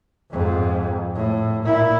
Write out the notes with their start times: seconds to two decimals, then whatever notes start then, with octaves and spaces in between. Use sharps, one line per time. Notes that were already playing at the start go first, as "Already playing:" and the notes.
0.31 F2 G#2
1.15 A2
1.64 A#2 E4